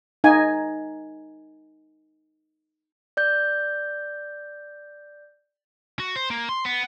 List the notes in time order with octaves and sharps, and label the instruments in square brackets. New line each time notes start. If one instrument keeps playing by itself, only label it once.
[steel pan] D#4 G#5
[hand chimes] D5 G6
[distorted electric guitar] F#4
C5
A#3
C6
B3